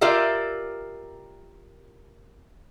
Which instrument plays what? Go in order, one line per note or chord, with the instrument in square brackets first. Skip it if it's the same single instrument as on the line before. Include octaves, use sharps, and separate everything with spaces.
[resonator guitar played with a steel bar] F4 G4 A#4 D5 E5